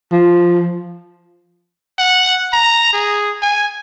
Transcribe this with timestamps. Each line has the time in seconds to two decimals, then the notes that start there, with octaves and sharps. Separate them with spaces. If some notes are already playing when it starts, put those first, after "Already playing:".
0.12 F3
1.99 F#5
2.53 A#5
2.93 G#4
3.42 G#5